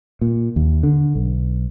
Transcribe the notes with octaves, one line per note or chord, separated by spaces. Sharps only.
A#2
D#2
D3
B1